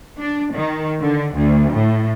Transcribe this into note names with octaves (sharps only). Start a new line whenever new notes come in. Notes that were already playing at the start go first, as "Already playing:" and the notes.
D4
D#3
D3
D2
A2